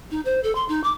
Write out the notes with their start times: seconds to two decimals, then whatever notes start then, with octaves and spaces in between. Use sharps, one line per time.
0.11 D#4
0.25 C5
0.44 A4
0.55 C6
0.69 D#4
0.84 D6